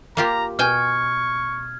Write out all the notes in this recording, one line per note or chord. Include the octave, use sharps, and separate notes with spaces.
A#3 F4 G4 A#5
B2 G5 G#5 C#6 F6 G#6